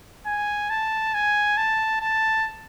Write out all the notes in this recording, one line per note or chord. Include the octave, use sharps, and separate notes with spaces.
G#5
A5
G#5
A5
A5